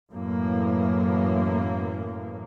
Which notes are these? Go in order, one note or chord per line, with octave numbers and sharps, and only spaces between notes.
F#2 A2 E3 A#3